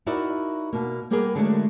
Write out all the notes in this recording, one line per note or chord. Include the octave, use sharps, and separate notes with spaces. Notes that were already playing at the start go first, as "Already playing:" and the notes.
D#4 E4 F#4 A#4 D5 E5
B2 A#3
G3 A#3 B3 G4 G#4 A#4
D3 F#3 G#3 A3 C4 D4